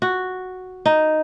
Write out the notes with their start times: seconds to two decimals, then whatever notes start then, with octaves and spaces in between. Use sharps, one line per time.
0.02 F#4
0.86 D#4